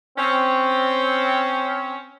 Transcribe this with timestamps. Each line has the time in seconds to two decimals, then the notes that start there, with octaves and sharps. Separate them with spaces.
0.17 C4 C#4